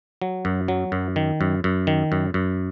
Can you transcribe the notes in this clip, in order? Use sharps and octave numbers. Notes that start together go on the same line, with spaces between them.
F#3
F#2
F#3
F#2
D#3
F#2
F#2
D#3
F#2
F#2